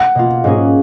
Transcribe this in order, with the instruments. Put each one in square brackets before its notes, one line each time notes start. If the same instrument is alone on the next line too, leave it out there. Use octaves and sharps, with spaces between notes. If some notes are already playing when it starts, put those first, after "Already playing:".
Already playing: [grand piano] F#5
[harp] B2 A#3 F4
G#2 F#3 A#3 C#4 G#4